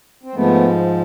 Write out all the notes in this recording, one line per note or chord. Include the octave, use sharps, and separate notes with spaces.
C4
G#2 F3 G#3 A3 B3